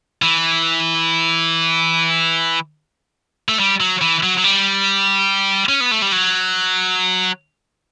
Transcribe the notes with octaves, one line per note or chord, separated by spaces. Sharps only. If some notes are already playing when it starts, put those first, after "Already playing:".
E3
A3
G3
F#3
E3
F#3
F#3
G3
C#4
B3
A3
G3
F#3